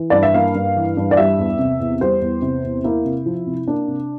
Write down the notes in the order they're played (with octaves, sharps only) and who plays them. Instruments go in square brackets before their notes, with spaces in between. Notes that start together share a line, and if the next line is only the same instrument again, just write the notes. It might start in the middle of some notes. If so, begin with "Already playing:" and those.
Already playing: [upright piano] E3
G2 D5
E5
A#3 F5
G2
E3
G2
D5
G3 E5
E2
C3
E2
G3 C5
E2
C3
E2
A#3 E4
C3
F3
C3
A#3 D4
C3